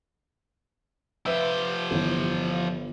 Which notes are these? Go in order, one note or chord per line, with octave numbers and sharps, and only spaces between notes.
F3 G4 B4 E5 E6
G1 E3